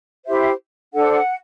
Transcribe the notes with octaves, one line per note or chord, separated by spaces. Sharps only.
E4 G4 C5 E5
D4 A4 C5 F#5